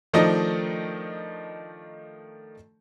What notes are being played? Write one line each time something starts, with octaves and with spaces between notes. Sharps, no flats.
D#3 F3 A3 D4 D#4 D#5